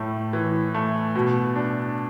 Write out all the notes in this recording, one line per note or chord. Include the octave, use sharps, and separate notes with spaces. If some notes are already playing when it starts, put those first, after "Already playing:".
Already playing: A2 A3
E3
A3
B2
D4